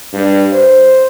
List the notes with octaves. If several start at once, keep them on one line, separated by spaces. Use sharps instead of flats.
G2
C5